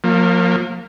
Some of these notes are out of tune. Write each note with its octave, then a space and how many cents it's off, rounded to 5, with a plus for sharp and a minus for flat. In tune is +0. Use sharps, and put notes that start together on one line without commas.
F3 +40 A#3 -10